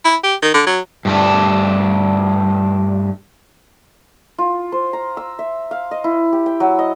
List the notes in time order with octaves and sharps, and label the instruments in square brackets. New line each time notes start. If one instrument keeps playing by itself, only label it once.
[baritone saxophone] E4
G4
D#3
D3
F#3
[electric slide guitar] G2 A3 D4
[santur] F4
C5
A#5
E6
E5
F5
D#5
E4
G4
G5
F#3
D#5